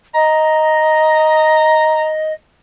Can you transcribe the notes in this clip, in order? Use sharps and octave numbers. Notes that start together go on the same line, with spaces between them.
D#5 A#5